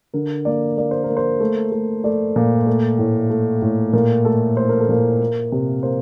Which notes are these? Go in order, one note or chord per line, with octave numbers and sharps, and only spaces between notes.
D3 A#4
A#3 D5
A#3 D5
C5
A#4
A#3
C5
A3
A3
A3 D5
A#2
A3
A2
A3
A2
A#2 A#4
A3 A4
A3 C5
A#4
A4
A#2 A#4
A#3
C3
A#3 C5